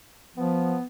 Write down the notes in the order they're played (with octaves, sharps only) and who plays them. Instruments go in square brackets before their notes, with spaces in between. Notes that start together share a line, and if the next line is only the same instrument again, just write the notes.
[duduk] F3 [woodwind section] B3